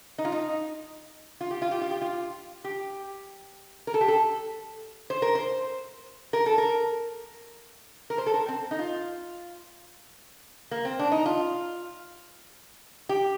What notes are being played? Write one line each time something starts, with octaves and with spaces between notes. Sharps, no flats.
D#4
F4
D#4
F4
G4
F4
G4
F4
G4
F4
G4
A#4
A4
G4
A4
C5
A#4
C5
A#4
A4
A#4
A#4
C5
A4
A#4
C4
D#4
F4
A#3
C4
D4
D#4
F4
G4